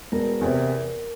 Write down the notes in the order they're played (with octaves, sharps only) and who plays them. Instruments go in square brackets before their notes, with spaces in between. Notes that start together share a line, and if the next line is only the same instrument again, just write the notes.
[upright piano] E1 [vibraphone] A#4
[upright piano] E2 C3